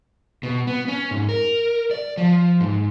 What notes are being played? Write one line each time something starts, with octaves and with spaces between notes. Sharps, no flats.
B2
B3
C#4
G#2
A#4
D5
F3
G#2